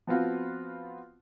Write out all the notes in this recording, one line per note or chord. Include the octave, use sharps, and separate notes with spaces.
F3 B3 C4 F4 F#4